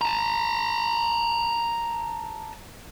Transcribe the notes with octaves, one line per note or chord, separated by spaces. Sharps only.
A5 A#5